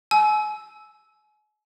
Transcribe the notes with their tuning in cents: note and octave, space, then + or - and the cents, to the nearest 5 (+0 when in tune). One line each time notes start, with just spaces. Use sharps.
G#5 +40 E6 -5